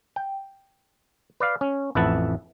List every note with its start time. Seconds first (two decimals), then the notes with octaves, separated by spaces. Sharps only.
0.16 G5
1.40 B4 D5 F5
1.61 C#4
1.95 A1 F2 E4 B4 F#5 A5